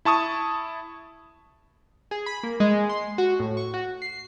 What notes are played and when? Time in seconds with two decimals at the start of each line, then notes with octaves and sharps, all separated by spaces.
0.05 E4 A5 C#6 D#6
2.11 G#4
2.26 B5
2.43 A#3
2.60 G#3
2.89 C6
3.18 F#4
3.40 A2
3.57 C#6
3.74 F#4
4.02 C7